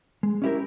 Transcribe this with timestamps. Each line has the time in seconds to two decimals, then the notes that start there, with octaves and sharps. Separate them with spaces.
0.23 G#3
0.42 C#4 E4 G4 A#4